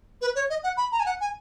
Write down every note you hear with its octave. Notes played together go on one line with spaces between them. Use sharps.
B4
C#5
D#5
F#5
B5
A#5
G#5
F#5
G#5